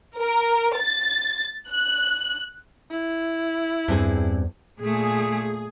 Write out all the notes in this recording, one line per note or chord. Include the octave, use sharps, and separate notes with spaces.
A#4
A6
F#6
E4
E2 G2 C4 G#4
A#2 A3 G#4